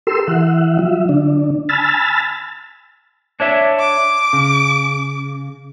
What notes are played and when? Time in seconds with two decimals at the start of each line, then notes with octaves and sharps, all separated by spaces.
0.07 G4 A4 A#4 C6 E6
0.27 E3 E5 F#5
0.79 F#3 F4 E5
1.09 D3 D4
1.69 G#5 A5 B5 E6 F6 A6
3.40 D4 C#5 E5
3.79 D6
4.33 C#3